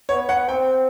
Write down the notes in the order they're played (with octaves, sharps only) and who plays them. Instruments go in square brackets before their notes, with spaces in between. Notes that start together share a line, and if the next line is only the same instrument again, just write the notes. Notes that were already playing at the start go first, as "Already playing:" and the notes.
[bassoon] B3 [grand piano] C#5
[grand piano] F#5
[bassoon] C4 [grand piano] G5